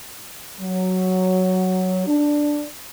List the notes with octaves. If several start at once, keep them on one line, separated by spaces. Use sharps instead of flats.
F#3
D4